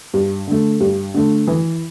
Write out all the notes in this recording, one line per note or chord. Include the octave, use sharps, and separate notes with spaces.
G2
D3 A3
G2
D3 A3
E3